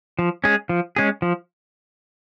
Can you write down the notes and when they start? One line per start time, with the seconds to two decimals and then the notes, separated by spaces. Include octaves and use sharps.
0.19 F3
0.44 G#3 C#4 G#4
0.69 F3
0.96 G#3 C#4 G#4
1.22 F3